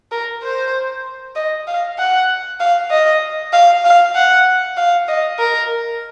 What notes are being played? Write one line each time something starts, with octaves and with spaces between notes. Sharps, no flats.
A#4
C5
D#5
F5
F#5
F5
D#5
F5
F5
F#5
F5
D#5
A#4